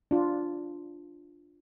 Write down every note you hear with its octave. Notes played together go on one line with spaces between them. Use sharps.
D4 F4